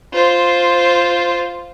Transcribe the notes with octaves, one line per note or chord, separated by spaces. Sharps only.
F4 C5